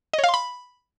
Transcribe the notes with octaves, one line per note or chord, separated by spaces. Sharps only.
D#5
C#5
F5
C6
B5